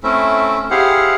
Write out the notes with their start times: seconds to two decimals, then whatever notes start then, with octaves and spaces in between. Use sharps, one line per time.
0.03 A3 C4 C#4 E4 E5
0.71 E4 G4 G#4 C5 F5 F#5